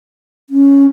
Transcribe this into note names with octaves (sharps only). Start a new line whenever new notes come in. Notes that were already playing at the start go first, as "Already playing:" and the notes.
C#4